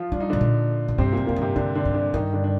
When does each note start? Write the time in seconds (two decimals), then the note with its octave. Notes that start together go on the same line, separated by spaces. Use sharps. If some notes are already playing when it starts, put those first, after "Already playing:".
Already playing: F3 F4
0.12 G3 D4
0.20 D#4
0.30 A2 D3 D4
0.41 A#2
0.88 A2
0.98 G2 C3 C4
1.12 F2 A#2 A#3
1.27 F2 A#2 A#3
1.36 G2
1.42 C3 C4
1.56 G2 D3 D4
1.75 D3 D4
1.85 G2
1.94 D3 D4
2.14 G2 D#3 D#4
2.33 D3 D4
2.44 D4